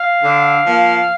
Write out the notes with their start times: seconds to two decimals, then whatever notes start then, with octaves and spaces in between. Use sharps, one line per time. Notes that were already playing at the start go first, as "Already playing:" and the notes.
Already playing: F5
0.22 D3
0.67 F3 A#3